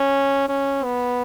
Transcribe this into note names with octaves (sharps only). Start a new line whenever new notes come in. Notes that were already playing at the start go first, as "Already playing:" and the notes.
Already playing: C#4
C#4
B3